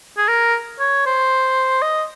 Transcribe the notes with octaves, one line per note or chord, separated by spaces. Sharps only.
G#4
A#4
C#5
C5
D#5